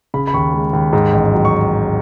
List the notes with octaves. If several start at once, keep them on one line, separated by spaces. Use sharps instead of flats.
C#3 B5
B5
D#2 C#6
G#3
D#2
G#2
A1
F#3
C#6